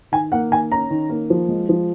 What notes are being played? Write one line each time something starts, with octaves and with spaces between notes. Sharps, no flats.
D#3 G#5
A#3 F#5
D#3 G#5
C#4 A#5
D#3
A#3
F3
G#3
F3